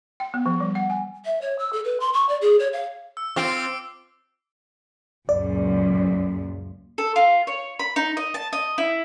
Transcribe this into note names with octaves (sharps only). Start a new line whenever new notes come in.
G5
B3
F3
G3
F#5
G#5
E5
C#5
E6
A4
B4
C6
C#6
D5
G#4
C#5
F5
E6
C4 F4 D6 C7 D7
C#2 F#2 A#2 D5
A4
F4
C#5
B5
D#4
D#5
A5
D#5
E4